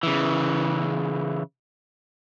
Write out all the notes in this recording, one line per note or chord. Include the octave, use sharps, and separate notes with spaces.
C#3 E3